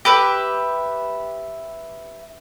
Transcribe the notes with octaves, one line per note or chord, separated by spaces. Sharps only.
G4 B4 E5